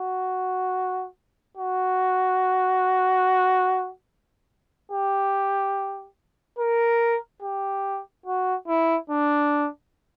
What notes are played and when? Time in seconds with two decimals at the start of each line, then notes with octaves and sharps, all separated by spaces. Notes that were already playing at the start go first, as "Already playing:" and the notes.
Already playing: F#4
1.57 F#4
4.92 G4
6.59 A#4
7.42 G4
8.26 F#4
8.67 E4
9.10 D4